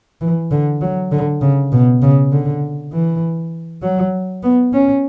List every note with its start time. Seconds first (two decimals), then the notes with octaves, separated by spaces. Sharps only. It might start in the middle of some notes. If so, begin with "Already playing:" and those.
0.21 E3
0.51 D3
0.81 F#3
1.11 D3
1.41 C#3
1.72 B2
2.02 C#3
2.32 D3
2.93 E3
3.82 F#3
4.43 B3
4.73 C#4